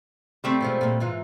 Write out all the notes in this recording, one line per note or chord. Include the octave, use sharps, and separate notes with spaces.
G3 A3 C4
B2 F3 G#3
A#2 G#3
G#2 E3 F4